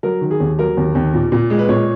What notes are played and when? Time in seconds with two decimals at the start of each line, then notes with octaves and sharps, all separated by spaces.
0.03 F#3 A#4
0.21 D#3
0.31 G#4
0.40 D#2
0.59 F#3 A#4
0.77 D#2
0.95 D#2
1.14 A#2
1.32 A#2
1.50 G#3
1.59 B4
1.69 A#2 C#5